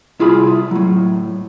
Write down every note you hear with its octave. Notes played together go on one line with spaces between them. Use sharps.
C2 E4 F4 G#4 B5
A2 F#3